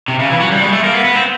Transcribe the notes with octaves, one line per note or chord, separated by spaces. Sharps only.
C3
C#3
E3
F#3
G3
G#3
A3
A#3
B3
B3
C4